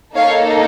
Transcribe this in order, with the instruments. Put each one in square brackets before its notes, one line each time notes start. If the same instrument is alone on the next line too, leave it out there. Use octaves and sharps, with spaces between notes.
[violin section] A#3 D#4 A4 C#5 F5